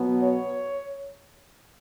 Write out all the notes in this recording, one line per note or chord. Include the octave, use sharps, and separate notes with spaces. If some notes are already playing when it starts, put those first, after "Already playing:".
Already playing: B2 F#3 B3
C#5